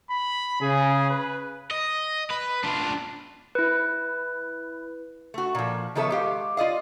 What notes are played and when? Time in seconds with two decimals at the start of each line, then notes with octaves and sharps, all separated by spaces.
0.11 B5
0.61 C#3 G#4
1.10 B4
1.71 D#5
2.31 B4
2.64 D4 F4
3.55 E4 B4
5.34 A3 F#4
5.55 A#2 F3
5.95 D#3 F3 B3 A4 C#5 E5
6.10 G#3 G4 F5
6.57 F4 D5 D#5 F5